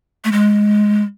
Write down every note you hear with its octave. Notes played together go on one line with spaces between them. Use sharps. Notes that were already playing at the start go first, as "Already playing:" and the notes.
A3
G#3